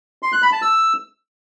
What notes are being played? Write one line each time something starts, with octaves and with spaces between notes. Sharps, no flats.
C6
F#6
B5
A5
E6